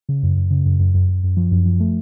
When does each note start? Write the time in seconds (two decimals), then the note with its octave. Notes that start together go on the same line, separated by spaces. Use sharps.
0.09 C#3
0.23 F#2
0.36 F#2
0.51 C#3
0.66 F#2
0.79 F#2
0.94 F#2
1.09 F#2
1.23 F#2
1.37 F3
1.51 F#2
1.66 F3
1.80 A3